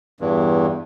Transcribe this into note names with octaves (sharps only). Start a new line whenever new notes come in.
E2 G2